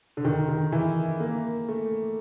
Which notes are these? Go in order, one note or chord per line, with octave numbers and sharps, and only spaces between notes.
D3
D#3
D#3
E3
A#3
A3